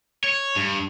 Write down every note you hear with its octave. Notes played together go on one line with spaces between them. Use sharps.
C#5
G2